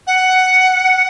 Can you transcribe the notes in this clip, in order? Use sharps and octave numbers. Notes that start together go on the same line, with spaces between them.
F#5